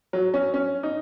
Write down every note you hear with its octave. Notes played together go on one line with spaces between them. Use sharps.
F#3
C#4
C#4
D#4